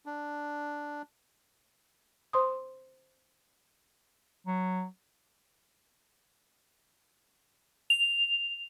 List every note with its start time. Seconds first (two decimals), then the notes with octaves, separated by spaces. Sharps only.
0.06 D4
2.33 C5 C6 D#6
4.47 F#3
7.90 F7